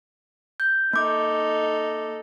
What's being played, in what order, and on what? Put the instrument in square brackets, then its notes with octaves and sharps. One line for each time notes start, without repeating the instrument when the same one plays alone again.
[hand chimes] G6
[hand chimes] A#3 D6 [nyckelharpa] D#4 A4